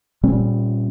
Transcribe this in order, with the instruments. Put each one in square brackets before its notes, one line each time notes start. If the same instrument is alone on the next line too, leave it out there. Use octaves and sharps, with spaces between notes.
[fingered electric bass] A#2 G3 C4 C#4